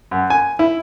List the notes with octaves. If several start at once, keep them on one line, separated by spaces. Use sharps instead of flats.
F#2
G#5
E4